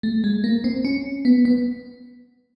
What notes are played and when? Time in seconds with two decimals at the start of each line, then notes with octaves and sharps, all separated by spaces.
0.03 A3
0.24 G#3
0.44 A#3
0.64 C4
0.85 C#4
1.25 B3
1.45 B3